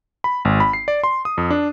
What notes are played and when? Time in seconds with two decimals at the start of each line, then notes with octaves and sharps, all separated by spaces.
0.24 B5
0.45 G#1
0.60 B5
0.73 C7
0.88 D5
1.04 C6
1.25 D#6
1.38 F2
1.51 D4